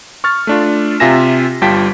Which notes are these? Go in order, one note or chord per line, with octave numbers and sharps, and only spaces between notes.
C#6 F6 A6
A3 D4 F4
C3 F4 E5 G#5 A#6 E7
G1 G3 F4 G5 A5 B6